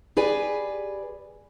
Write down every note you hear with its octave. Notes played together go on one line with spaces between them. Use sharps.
G4 G#4 B4 D5 G#5